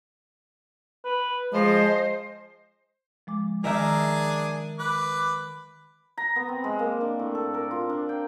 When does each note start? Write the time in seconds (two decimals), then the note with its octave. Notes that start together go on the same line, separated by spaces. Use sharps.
1.05 B4
1.53 F3 G#3 C5 D#5
3.27 F3 G#3 D6
3.64 D#3 G#3 D4 G#4 A#4 E5 G#5 A#5
4.79 B4 D6 F#6
6.18 A#5
6.36 B3
6.49 C4
6.64 G#3
6.79 A#3
7.01 D4
7.19 A2
7.35 A4
7.54 A#4
7.71 F4
7.89 D4
8.09 G5